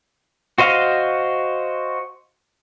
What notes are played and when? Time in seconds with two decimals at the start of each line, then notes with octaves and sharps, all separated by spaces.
0.58 F#4 C5 D#5 F5